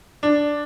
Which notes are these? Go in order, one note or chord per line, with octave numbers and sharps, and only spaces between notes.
D4